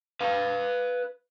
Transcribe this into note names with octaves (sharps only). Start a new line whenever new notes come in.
B4 F5